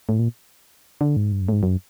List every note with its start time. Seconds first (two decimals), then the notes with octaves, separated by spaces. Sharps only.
0.09 A2
0.19 A#2
1.01 D3
1.17 G#2
1.32 G2
1.41 F#2
1.49 A2
1.52 G#2
1.63 F#2